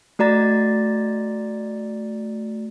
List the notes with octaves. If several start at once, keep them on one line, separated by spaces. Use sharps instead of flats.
A3 F#4 D5 A#5 A6